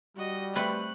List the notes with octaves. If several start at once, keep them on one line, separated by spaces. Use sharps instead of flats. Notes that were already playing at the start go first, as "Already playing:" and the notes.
G3 F#4 D#5
A3 C4 B4 F#6